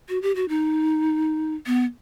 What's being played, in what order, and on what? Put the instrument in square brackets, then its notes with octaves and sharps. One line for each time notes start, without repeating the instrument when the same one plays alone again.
[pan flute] F#4
G4
F#4
D#4
B3